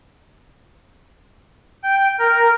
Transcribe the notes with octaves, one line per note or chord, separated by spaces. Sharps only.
G5
A#4